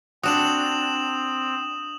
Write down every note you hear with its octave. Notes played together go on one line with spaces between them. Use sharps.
C4 D4 F#4 D#6 E7 F#7